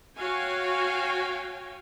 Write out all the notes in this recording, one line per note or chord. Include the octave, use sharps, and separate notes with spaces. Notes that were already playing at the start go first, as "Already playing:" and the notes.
F#4 C#5 F5 G5 G#5